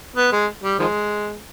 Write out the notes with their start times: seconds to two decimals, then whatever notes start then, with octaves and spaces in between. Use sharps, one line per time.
0.16 B3
0.32 G#3
0.63 G3
0.79 D#3 F3 G#3